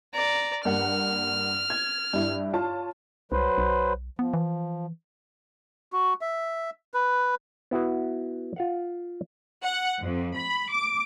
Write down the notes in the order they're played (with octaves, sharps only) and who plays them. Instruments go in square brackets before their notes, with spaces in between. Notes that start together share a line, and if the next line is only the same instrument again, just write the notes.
[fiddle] D5 A#5
[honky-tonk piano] G2 A#3 F#5 [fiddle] F6
[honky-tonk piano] G#6
G2 E4
F4 C#5 A5
[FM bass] C2 [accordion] F#3 B4 C5
[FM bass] B1
[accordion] F3 [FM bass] B3
[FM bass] E3
[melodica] F#4
E5
B4
[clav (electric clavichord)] B3 E4 F#4 B4
F4 F5 F#5
[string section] F#5
F2
B5
D6